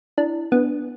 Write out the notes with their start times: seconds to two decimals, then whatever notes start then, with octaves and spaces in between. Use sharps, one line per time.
0.18 D4 E4
0.52 B3 D4